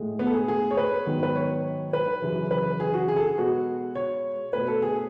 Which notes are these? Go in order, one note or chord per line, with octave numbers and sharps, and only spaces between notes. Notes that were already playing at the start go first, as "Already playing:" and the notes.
Already playing: A2 G#3
B3
A4
G#4
G#4
C#5
B4
G#2 D#3 F#3 B3
B4
C#5
B4
F#2 C#3 E3
B4
G#4
F#4
G#4
A4
G#4
B2 G#3 B3 F#4
C#5
B2 A3 B4
A4
G#4